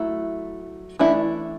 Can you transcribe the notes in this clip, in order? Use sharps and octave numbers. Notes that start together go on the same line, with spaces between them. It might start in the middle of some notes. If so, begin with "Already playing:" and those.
Already playing: F#3 A3 E4
E3 A3 D4 E4